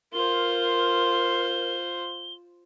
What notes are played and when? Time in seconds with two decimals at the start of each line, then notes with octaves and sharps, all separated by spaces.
0.13 F4 A#4 C5 G7